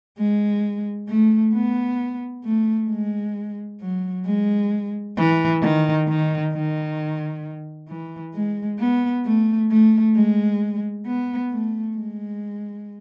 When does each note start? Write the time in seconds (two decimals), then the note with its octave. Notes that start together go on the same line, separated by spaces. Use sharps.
0.18 G#3
1.09 A3
1.54 B3
2.44 A3
2.90 G#3
3.81 F#3
4.25 G#3
5.17 E3
5.61 D#3
6.08 D#3
6.53 D#3
7.88 E3
8.34 G#3
8.79 B3
9.25 A3
9.70 A3
10.15 G#3
11.06 B3
11.51 A3
11.97 G#3